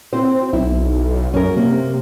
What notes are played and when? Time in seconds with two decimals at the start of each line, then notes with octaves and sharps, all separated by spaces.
0.13 C4 E4 F#4 C5
0.53 B1 E4
1.34 F#2 C#4 A#4
1.57 C3 A#3